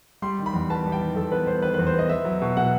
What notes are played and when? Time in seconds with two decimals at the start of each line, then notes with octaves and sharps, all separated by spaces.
0.22 G3 C6
0.39 D#3
0.46 B5
0.53 E2
0.70 B3 A5
0.86 G3
0.92 G5
1.01 D#3
1.16 E2 A4
1.32 B3 B4
1.47 G3 C5
1.62 D#3 B4
1.74 E2 B4
1.87 C5
1.94 B3
1.99 D#5
2.09 B3 E5
2.25 F#3
2.42 B2
2.57 B2 F#5